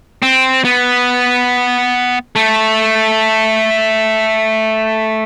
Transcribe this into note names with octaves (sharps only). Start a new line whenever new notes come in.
C4
B3
A3